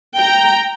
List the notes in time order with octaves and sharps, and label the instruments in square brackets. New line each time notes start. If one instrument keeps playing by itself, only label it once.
[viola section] G5 A#5